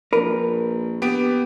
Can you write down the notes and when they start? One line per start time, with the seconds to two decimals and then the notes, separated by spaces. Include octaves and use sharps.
0.13 A#1 A#4 B4
1.02 B3 G4 D7